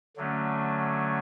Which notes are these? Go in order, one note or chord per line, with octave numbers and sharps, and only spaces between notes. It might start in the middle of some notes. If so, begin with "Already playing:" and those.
D3 F#3 A3 C#4